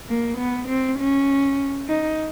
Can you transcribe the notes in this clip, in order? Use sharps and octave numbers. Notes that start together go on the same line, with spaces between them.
A#3
B3
C4
C#4
D#4